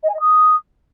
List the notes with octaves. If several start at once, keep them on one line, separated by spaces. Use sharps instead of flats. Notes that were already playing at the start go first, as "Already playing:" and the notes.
D#5
G#5
D#5
D#6